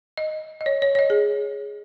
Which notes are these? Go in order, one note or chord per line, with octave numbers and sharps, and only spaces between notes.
D#5
D#5
C#5
C#5
C#5
D#5
G#4